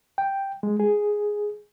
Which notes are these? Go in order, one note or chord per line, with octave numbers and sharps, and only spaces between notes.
G5
G#3
G#4